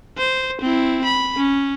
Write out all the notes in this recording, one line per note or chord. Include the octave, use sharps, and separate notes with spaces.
C5
C4 E4
B5
C#4